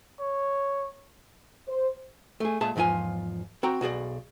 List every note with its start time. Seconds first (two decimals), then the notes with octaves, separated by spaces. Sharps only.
0.20 C#5
1.68 C5
2.40 A3 G#4
2.61 A#2 G#3 G#4 E5 A5
2.76 E2 G#2 F3 F4 G#5
3.63 C4 F#4 G5 A#5
3.81 B1 F#4 G#4 D5